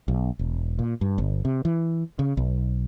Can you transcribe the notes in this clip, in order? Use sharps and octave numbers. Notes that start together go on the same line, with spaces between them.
B1
E1
A#2
G2
G1
C3
E3
C#3
B1